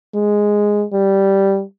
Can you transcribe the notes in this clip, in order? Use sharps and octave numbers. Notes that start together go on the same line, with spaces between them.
G#3
G3